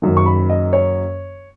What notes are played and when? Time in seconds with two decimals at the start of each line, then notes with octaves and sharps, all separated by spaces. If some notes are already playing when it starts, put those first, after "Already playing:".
0.02 F#1 F#2 D#3
0.17 C#6
0.26 B5
0.49 D#5
0.73 C#5